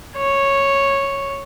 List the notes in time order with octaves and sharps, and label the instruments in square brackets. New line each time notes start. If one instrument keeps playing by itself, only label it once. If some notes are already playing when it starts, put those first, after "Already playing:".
[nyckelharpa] C#5